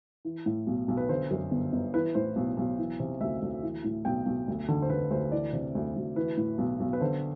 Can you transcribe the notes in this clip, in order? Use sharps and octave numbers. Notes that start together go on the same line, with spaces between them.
E3
A2
B1
B1
B4
D3 C5
F#2
G1
G1
E3 B4
A2 C5
B1
B1
E3
C3
D2 E5
D2
E3
A2
B1 G5
B1
D2
D3
C5
D3 B4
D2 C5
E3 D5
C3
D2
D2
E3 B4
A2
B1
B1
B4
D3 C5